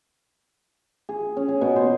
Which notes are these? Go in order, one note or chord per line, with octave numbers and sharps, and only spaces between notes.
G#4
C#4
G#4
B2
C5